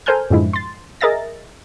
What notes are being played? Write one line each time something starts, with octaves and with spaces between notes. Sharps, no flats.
A4 A#4 C5 G#5 F6 G6
F#2 A2 D3 F3 G#3 E4
C6 A6
G#4 A#4 D#5 E5 A6 A#6